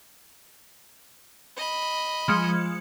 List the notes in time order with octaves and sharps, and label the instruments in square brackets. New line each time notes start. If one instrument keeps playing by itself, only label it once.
[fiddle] D#5 B5
[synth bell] F3 G#3 C#7